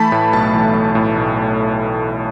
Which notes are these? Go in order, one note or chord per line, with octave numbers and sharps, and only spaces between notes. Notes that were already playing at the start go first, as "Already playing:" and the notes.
Already playing: E3 A3 A5 B5
A2 B5
B1 A5
E3
A3
A2
B1